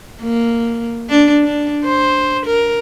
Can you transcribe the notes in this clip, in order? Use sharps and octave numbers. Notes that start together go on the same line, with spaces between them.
A#3
D4
D4
C5
A#4